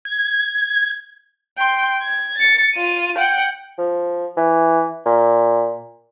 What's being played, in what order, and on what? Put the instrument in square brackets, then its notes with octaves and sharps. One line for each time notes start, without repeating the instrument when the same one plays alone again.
[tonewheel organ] G#6
[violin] G5 C6
G#6
A6 C#7
F4 D#7
F#5 G5
[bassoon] F3
E3
A#2